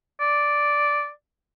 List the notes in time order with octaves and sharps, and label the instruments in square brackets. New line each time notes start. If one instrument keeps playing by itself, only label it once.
[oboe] D5